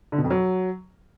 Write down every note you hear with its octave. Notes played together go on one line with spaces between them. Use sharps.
D3
B2
F2
F#3